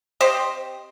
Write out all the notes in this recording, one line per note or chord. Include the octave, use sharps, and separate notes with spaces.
C4 G4 C5 D#5